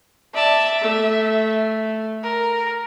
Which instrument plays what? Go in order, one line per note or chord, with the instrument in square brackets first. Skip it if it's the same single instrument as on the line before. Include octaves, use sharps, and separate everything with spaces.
[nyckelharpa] D5 A5 [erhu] E5
[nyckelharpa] A3
[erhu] A#4